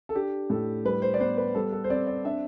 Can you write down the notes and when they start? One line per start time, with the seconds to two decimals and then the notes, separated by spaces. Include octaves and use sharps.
0.09 A4
0.15 D4 G4
0.50 A2 A4
0.85 G3 B4
1.02 C5
1.14 D5
1.20 B3 C5
1.37 B4
1.55 G3 A4
1.73 A4
1.84 C5
1.90 C4 D5
2.07 D5
2.24 D4 E5